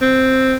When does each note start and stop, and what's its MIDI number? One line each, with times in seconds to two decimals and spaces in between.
0.02 0.56 60